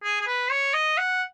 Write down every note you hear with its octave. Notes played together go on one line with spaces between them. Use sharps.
G#4
G#4
B4
C#5
D#5
F#5